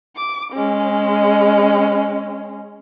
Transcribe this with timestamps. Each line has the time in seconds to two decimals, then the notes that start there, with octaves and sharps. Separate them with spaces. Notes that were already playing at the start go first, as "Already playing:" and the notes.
0.16 D6
0.53 G#3 C#4